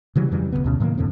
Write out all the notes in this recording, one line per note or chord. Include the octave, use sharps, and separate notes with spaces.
C#3 E3 F#3 G3
F2 C#3 E3 G3
D#1 B1 C#3 B3
D2 B2 C#4
A2 D#3 F#3 A#3
F2 A2 D3 C4